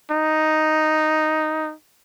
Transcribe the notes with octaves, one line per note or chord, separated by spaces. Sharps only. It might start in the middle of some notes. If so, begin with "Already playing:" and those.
D#4